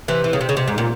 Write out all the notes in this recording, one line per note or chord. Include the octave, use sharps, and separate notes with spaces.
C3 E3
E3
C#3
C3
C#3
C3
G#2
A#2